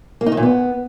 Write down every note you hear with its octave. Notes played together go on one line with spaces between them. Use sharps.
A#3
D#4
D#3
A#2
B3